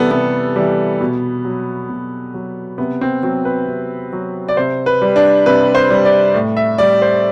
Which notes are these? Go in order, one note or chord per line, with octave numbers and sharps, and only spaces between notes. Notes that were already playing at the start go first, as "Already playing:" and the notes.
Already playing: C3 E3 G3 B3 A4
C3 B3
E3 G3
B2
F#3
B2
F#3
C3 B3
C4
F#3 C4
B4
C3
F#3
D5
C3 C5
B4
G3
D4
C3 B4
C5
G3
D5
A2
E5
G3 D5
C5